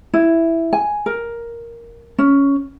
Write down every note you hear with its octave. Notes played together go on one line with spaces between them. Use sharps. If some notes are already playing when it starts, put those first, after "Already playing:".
E4
G#5
A#4
C#4